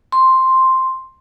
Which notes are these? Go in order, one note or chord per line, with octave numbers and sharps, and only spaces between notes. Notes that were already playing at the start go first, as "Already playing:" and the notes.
C6